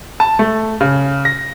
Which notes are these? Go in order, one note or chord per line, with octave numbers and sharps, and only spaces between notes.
A5
A3
C#3
A#6